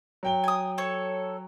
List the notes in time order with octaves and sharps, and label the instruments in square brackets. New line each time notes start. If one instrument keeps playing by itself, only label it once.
[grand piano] F#3 G5 G7
[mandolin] G#5 D#6
A4 C#5